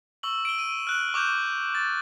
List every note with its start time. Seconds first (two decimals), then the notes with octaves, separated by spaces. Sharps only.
0.23 C#6 E6 F#7
0.45 D7 G7
0.59 D#7
0.87 F6 F#6 F#7
1.14 C#6 D6 F#6 G6
1.75 A6